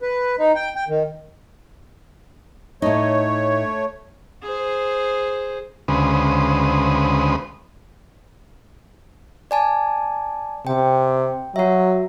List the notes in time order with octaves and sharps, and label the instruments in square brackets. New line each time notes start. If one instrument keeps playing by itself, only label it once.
[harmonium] B4
D#4
G5
G5
D#3
[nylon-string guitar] A2 D#4 [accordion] A3 C#5
[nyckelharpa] G#4 C5
[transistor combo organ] D2 C#3 G#3 B4 C5 D#6
[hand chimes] D5 G#5 A5
[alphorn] C3 [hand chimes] G5
[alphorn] F#3 [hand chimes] F#4 E5